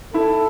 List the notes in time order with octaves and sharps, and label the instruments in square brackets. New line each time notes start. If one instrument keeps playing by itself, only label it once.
[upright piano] E4 [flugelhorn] A4